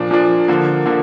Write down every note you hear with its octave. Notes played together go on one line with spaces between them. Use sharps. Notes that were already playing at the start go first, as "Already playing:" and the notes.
Already playing: A#2 F3 D4
A#2 F3 D4
D3 F3 A#3
D3 F3 A#3